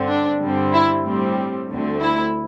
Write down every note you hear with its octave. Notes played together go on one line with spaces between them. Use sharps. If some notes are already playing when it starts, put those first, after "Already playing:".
Already playing: G2 D3 C4
D4
G2 D3 G3 C4
E4
A2 G3 C4
D2 D3 A3 C4
E4